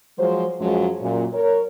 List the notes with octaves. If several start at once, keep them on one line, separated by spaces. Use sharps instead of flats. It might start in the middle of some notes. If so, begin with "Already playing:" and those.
F3 F#3 G#3 C5
F#2 F3 F#3 G#3
F#2 A#2
A#4 C#5